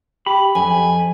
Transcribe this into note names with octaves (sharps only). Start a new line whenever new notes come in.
G4 B5
F2 G#5